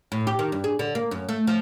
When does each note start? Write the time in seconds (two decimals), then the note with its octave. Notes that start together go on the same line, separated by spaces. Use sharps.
0.12 A2
0.27 G4
0.39 D#3
0.52 G2
0.64 G#4
0.79 D3
0.95 A#3
1.11 F#2
1.29 A3
1.47 F3